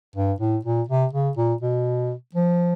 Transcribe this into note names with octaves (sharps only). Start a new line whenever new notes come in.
G2
A2
A#2
C3
C#3
A#2
B2
F3